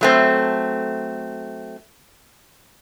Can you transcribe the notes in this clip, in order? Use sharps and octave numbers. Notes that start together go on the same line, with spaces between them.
F#3 A3 C4